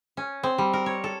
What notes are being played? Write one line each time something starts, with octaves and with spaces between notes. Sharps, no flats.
C#4
C4
G3
A#4
C#5
A4